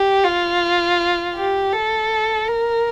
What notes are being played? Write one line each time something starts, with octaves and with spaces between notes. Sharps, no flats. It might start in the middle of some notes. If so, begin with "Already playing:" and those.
Already playing: G4
F4
G4
A4
A#4